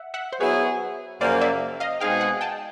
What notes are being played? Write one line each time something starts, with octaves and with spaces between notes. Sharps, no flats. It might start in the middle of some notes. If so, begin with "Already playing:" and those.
Already playing: E5 F#5
E5 F#5
C5
F#3 B3 E4 G#4 B4 C#5
F#2 C#3 F3 A#3 C5 D5
D5 E5
D#5 F5
B2 G#3 C4 D#4 G#4 F5 G5
F#5 G#5
G5 A5